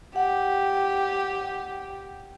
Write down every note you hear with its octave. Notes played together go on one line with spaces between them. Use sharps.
G4 F#5